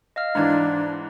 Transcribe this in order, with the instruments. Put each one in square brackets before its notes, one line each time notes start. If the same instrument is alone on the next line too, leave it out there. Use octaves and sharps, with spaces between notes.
[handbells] D#5 F5 F6
[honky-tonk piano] G#2 E3 [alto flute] D4 [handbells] D#4 G#6